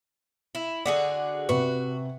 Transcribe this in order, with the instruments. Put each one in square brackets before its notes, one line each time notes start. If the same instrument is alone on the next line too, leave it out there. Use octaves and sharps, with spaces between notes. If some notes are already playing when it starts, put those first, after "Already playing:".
[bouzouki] E4
[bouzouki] D3 F#4 G#4 [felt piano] D5
[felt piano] C3 B4 [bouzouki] F#4